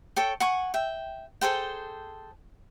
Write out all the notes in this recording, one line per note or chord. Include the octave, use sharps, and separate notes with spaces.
A4 C#5 G5
F#5 G#5 C#6
E5 G5
G#4 A4 C5 G5